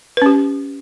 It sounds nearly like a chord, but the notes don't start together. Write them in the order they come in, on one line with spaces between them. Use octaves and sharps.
B4 C#4 G4